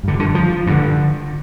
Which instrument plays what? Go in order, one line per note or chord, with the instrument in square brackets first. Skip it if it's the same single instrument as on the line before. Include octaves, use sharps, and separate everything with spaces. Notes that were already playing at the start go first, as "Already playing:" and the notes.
[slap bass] G2 D3
D3
F3
G2 D3